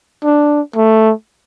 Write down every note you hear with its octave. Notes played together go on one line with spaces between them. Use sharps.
D4
A3